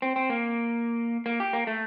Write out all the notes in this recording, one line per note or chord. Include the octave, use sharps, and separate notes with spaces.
C4
C4
A#3
A#3
G4
A#3
A3